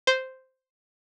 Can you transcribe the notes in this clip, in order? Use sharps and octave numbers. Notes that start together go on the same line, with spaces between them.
C5